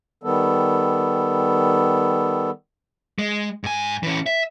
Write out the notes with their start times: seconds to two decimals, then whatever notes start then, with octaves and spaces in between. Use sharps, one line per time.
0.23 D#3 G3 B3 A4
3.19 G#3
3.64 G#2 G#5
4.03 E3 C#4
4.26 E5